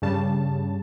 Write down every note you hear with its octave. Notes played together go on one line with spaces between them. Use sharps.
G2 C#3 G3 A5